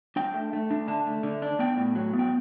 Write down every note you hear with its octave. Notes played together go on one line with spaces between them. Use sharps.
D4 G5
A3
A3
D4
D3 A5
A3
D3
D4
B3 G5
A2
F#3
B3
G5